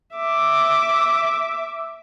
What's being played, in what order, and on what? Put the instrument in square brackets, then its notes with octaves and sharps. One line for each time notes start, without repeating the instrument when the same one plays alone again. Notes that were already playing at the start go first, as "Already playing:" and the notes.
[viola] E5 D6